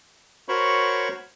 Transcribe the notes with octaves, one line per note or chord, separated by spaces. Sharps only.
F#4 A#4 C5 C#5 B5 C#6